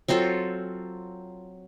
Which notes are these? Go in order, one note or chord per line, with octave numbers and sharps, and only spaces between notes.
F#3 C4 F4 A4